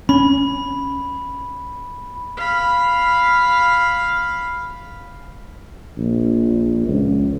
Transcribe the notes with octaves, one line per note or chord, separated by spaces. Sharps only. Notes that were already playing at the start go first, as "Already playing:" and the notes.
C#4 B5
F5 B5
A#1
C#2